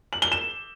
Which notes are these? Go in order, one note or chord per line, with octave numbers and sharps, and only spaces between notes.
F#7
G7
E7